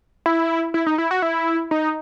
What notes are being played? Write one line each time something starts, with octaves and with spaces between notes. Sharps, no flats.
E4
E4
D#4
E4
F#4
E4
D#4